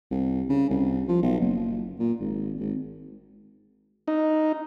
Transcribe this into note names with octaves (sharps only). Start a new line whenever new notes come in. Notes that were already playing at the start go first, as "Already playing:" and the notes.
C2
C#3
C2
F3
B1
F#1
A#2
G#1
G#1
D#4